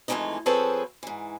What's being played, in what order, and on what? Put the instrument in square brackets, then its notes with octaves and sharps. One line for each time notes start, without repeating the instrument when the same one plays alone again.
[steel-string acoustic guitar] F2 E3 F3 G#3 A3 D#4
F3 C4 G#4 A4 B4 C#5
G#2 E3